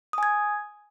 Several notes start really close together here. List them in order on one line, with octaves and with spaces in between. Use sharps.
D#6 G#5 G#6